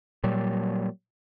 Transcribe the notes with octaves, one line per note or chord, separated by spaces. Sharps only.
A#2 F#3 G3